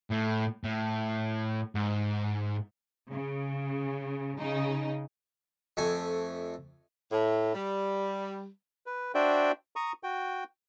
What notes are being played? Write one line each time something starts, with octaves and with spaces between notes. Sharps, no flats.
A2
A2
G#2
C#3
C#3 D#4
F2 A3 G#5
A2
G3
B4
D4 F#4 C5 D5 E5 G5
A#5 C#6 D#6
F#4 G5